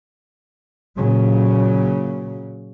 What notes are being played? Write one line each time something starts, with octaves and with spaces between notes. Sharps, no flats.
A#2 C#3 F#3